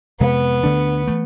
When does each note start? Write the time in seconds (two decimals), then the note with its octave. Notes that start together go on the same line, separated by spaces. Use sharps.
0.20 F2 C3 G#3 B3
0.63 D2 D3 A3 D4
1.07 E3 A3